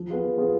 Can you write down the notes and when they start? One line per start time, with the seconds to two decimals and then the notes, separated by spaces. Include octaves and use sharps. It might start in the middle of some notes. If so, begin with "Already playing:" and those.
Already playing: F3
0.09 B3 F4 G#4
0.23 F3
0.38 B3 F4 G#4